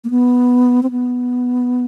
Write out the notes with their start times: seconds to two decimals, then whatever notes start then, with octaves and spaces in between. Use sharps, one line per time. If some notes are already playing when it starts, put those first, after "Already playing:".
0.04 A#3
0.10 B3
0.83 C4
0.91 B3